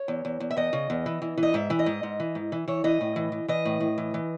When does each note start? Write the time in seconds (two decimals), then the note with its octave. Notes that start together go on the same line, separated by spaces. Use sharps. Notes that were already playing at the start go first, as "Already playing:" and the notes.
Already playing: C#5
0.08 E2
0.25 E2
0.40 E2
0.51 E5
0.57 E2 D#5
0.73 C#3
0.90 E2
1.06 E3
1.22 E3
1.38 E3
1.43 D#5
1.54 G#2 E5
1.70 E3
1.79 D#5
1.86 G#2
2.03 G#2
2.20 E3
2.35 G#2
2.52 E3
2.68 E3 C#5
2.84 E3 D#5
3.01 A2
3.16 E3
3.32 E3
3.48 E3 D#5
3.65 A2
3.80 A2
3.98 E3
4.14 E3